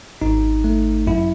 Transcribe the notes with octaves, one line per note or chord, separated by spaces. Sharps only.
G#1 D#4
A3
F#2 E4